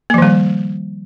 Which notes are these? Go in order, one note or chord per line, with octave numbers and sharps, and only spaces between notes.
D#3 F3 G3 A#3